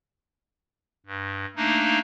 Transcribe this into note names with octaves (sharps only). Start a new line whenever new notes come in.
G2
A3 A#3 D4 D#4